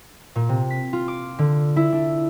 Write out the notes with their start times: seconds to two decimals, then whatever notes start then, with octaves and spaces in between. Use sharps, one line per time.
0.36 A#2
0.49 C3
0.70 B6
0.93 F4
1.08 D6
1.39 D3
1.76 E4
1.93 D4